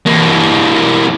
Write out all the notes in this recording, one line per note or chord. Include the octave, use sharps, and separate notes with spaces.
E3 A#3